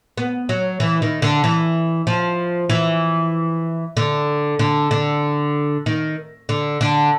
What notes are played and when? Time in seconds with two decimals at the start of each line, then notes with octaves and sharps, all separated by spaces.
0.17 B3
0.49 F#3
0.80 E3
1.02 D#3
1.22 D3
1.44 E3
2.07 F3
2.70 E3
3.97 D3
4.59 D3
4.91 D3
5.86 D#3
6.49 D3
6.81 D3